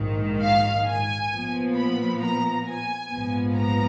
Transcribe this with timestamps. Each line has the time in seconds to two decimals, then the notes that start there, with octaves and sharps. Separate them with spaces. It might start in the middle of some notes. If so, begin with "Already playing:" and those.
Already playing: A#1 G#2 D#3
0.43 F5
0.88 G#5
1.33 A#2 F3 B3
1.77 B5
2.22 A#5
2.67 G#5
3.11 A#1 G#2 F3 B3
3.56 A#5